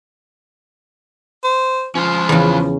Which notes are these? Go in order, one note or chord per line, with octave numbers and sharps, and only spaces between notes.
C5
F3 C#4 F4 F5
E2 C#3